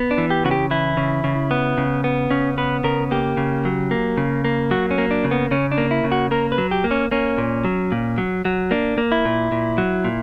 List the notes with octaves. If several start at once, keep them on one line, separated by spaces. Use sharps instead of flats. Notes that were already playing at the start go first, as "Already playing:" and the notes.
Already playing: B3
D4
E3
G4
C#3 F#4
G4
E3 E4
C#3
C#3
B3
C#3
B3
C#3 C#4
B3 B4
C#3 A#4
A#3 G4
C#3
F#3
A#3
C#3
A#3
F#3 F#4
C#4
A#3
D4
C#3
B3
C#3 C#4
D4
A#3
E4
C#3
F#4
A#3 A#4
B4
F#3
G4
A#3
C#4
A#3 C#4
A#2
F#3
A#2
F#3
F#3
A#3 D4
A#3
E4
A#2
A#2
F#3
A#2